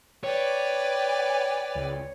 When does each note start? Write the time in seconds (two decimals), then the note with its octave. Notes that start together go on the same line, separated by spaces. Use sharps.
0.24 B4 C#5 D5 G5
1.75 C#2